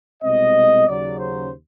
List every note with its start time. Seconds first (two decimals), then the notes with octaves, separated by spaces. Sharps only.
0.22 C2 B2 G#3 C4 D#5
0.86 D#2 C#3 F#3 D5
1.18 C5